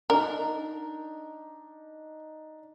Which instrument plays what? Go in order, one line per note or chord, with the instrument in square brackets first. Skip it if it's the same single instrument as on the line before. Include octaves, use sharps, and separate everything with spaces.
[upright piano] D4 D#4 [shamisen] A#4